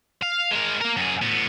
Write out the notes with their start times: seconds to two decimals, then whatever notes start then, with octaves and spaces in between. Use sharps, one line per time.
0.23 F5
0.51 G#3 A#4
0.81 A#3 A#4
0.97 F#2 G#4
1.22 A2 B3